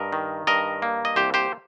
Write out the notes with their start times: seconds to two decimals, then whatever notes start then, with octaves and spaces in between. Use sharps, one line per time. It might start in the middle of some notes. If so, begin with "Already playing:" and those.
Already playing: G2 A#4 D#5
0.12 D#3
0.47 G2 A#4 D#5
0.82 A#3
1.05 D#5
1.16 C2 G4 C5
1.34 G4 C5